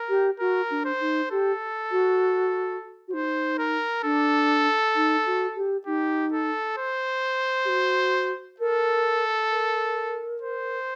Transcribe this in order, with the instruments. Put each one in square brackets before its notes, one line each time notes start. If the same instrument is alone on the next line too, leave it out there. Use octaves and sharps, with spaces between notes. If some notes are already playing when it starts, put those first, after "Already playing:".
Already playing: [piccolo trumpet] A#4
[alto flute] G4
[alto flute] F#4 [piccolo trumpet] A#4
[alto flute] D4
[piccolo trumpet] C5
[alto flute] D#4
[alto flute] G4 [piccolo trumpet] A4
[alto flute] F#4
F#4
[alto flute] D#4 [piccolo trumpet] C5
[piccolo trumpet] A#4
[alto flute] D4 [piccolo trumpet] A4
[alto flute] D#4
F#4
G4
[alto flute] D#4 [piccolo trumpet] G4
[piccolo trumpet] A4
C5
[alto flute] G4
F#4
[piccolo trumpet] A4 [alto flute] A#4
[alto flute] A#4
[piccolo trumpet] C5